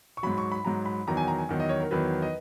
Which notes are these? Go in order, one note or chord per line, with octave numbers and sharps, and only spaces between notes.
C#6
G#2 F#3 B5
C#6
B5
G#2 F#3 A#5
B5
E2 D#3 F#3 A#5
G#5
A#5
G#5
E2 D#3 F#3
D#5
C#5
A#4
E2 D#3 F#3 B4
D#5